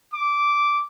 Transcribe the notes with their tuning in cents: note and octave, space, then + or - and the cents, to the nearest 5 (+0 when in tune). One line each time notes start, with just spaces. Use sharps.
D6 -10